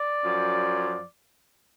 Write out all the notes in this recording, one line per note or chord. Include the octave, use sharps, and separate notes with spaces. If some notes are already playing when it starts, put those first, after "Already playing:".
Already playing: D5
F#2 F3